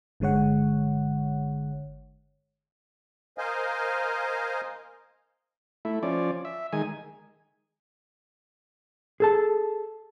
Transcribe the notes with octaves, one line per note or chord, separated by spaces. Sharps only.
G1 D3 G#3 C#5 F#5
A#4 C5 D#5 F5 G#5
A3 E4
F3 C#4 D5
E5
D#3 G#3 G#5
G#4 A4 A5